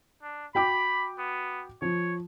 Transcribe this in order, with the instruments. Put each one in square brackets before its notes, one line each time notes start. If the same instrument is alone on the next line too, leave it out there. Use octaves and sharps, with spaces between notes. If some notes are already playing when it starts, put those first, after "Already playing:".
[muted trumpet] D4
[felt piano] F#4 G5 D6 [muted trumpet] B5
[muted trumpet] B3
[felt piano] F3 [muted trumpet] C#5